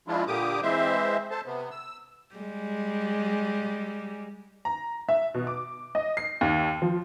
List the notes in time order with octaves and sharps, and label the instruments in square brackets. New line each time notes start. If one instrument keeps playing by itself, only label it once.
[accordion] F3 G#3 D4 E4 F4
A#2 D3 A#3 G4 D6 D#6
E3 G#3 C4 C5 E5
A4 C5 A5
C3 B3
E6
[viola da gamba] G3 G#3
[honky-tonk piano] A#5
E5
B2
D6
D#5
C7
D#2
F3